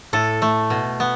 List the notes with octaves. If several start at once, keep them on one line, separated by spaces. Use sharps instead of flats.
A2 A4
A3
B2
B3